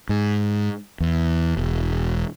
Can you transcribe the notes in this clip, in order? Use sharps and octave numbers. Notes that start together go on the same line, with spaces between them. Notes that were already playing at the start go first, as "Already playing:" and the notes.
G#2
E2
E1